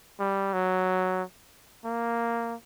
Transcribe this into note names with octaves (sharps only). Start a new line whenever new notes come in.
G3
F#3
A#3